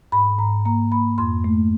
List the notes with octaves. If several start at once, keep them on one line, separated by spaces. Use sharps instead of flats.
G#2 B5
G#2 A#5
A#3 A#5
A#3 B5
F2 C6
A3